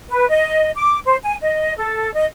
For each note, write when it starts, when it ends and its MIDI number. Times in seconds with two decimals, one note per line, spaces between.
0.08 0.29 71
0.29 0.69 75
0.76 0.99 86
1.04 1.16 72
1.23 1.35 80
1.42 1.73 75
1.77 2.12 69
2.14 2.25 75